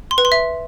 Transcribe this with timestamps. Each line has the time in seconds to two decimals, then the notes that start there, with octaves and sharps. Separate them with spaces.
0.11 C6
0.18 B4
0.25 C6
0.32 E5